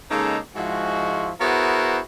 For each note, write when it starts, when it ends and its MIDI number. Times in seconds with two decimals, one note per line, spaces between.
0.10 0.38 49
0.10 0.38 56
0.10 0.38 58
0.10 0.38 63
0.10 0.38 69
0.10 0.38 82
0.56 1.31 44
0.56 1.31 53
0.56 1.31 56
0.56 1.31 64
0.56 1.31 66
1.40 1.99 59
1.40 1.99 64
1.40 1.99 66
1.40 1.99 68
1.40 1.99 70
1.40 1.99 72